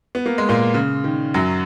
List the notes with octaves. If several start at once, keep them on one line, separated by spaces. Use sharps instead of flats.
B3
A#3
G#3
A#2 A#3
C#3
D#3
F#2 F#3